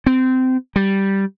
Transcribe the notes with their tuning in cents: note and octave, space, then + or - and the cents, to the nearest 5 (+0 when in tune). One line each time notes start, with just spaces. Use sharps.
C4 -20
G3 -5